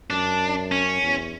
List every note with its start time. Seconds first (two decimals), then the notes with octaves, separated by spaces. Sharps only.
0.10 F#2 D4
0.72 C#4
1.02 E2